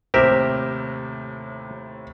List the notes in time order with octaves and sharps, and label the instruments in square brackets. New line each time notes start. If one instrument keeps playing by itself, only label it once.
[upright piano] D#2 A2 C3 [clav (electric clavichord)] G4 A#4 E5 [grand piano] C5